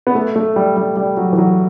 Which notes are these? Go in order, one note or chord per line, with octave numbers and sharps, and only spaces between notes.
B3
A3
A3
G3
G3
G3
F#3
E3
F#3